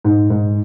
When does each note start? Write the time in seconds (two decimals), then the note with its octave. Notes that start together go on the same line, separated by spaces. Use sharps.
0.05 G#2
0.30 G#2